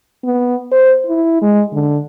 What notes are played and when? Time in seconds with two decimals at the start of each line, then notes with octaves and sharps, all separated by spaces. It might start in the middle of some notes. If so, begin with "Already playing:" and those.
0.24 B3
0.72 C5
1.07 E4
1.42 G#3
1.73 D3